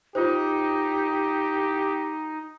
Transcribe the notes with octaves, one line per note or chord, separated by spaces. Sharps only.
D#4 F4 G4 C5